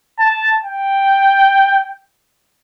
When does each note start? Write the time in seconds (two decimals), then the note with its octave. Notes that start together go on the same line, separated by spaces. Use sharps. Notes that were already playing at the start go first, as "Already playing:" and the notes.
0.19 A5
0.64 G5